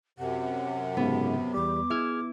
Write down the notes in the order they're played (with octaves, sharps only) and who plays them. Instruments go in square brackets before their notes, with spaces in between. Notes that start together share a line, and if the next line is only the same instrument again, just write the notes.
[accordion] F#2 C3 [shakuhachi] F#5
[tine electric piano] G#2 C#3 [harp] B3
[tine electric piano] E2 G3 [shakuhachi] D6
[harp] E4 [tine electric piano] G#4 F6 G#6